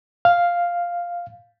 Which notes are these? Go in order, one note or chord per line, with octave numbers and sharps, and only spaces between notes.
F5